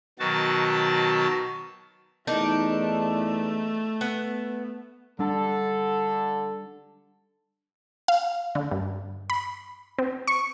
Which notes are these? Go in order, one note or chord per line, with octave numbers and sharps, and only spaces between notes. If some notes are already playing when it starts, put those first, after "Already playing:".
B2 D#3 F#3 F#4 A5
E2 A3 D4 D#4 A#4
B3
D3 G3 D4 A4
F5
D3
G2
B5
C4
C#6